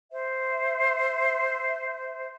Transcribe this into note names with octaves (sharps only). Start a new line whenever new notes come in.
C5 E5